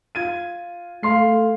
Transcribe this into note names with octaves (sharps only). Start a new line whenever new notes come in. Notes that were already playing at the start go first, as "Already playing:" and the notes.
F4 G#6 D#7
A3 F5 C6 C7